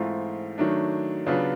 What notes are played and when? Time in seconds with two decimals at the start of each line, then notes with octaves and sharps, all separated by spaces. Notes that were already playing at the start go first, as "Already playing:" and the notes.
Already playing: G#2 E3 A3 C4 F4
0.58 D#3 F#3 A3 D4
1.26 C#3 F#3 B3 D4 F4